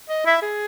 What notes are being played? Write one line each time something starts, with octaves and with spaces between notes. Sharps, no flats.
D#5
E4 E5
G#4